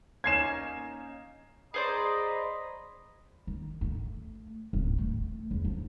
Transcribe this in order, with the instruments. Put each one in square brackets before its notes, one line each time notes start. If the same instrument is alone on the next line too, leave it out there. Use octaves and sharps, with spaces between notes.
[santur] A#3 C#4 D#4 [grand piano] G#6 C7 E7
[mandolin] G#4 C5 D5 [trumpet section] D#5 A#5 B5
[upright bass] D#3
A3
D1
A3
E2
F3